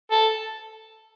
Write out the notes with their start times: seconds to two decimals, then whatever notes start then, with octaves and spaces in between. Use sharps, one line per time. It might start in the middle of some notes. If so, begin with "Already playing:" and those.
0.11 A4